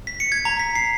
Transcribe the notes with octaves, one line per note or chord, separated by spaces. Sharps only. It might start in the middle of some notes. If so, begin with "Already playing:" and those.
B6
C#7
G#6
A#5
B6
C7